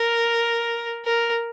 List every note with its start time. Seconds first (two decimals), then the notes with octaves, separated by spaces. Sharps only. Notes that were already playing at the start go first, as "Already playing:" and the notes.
Already playing: A#4
1.05 A#4